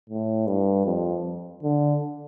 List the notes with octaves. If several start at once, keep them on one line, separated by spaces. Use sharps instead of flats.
A2
G2
F2
D3